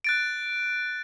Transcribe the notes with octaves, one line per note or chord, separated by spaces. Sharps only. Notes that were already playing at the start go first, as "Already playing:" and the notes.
F#6 A6 D7